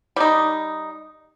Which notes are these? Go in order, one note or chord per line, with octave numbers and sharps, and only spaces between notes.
G3 D#4